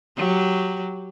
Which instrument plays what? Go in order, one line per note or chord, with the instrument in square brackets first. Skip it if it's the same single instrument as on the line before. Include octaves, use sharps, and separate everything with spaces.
[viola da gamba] F#3 G4